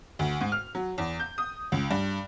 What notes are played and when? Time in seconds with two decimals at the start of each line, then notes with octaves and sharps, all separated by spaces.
0.19 D2
0.40 G#2
0.52 F6
0.75 F#3
0.98 E2
1.20 G6
1.38 D#6
1.72 C#2
1.91 G2